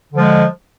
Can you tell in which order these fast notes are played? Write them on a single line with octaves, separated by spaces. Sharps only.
D3 F3 G#3